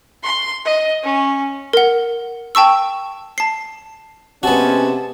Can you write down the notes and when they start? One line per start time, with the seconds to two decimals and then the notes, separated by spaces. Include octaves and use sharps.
0.24 C6
0.65 D#5
1.03 C#4
1.73 A#4 F#5
2.55 G5 A5 C#6 E6
3.38 A5 C7
4.43 C3 G#3 B3 C#4 F#4 A5